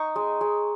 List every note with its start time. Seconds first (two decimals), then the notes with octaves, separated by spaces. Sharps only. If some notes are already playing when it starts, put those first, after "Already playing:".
Already playing: D#4 C#6
0.16 G#3
0.41 G#3